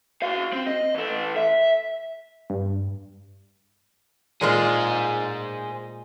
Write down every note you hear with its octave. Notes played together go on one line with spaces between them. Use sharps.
F#4 F5
C4
D#5
E3 A4
E5
G2
A#2 G#3 F4 G#4 C5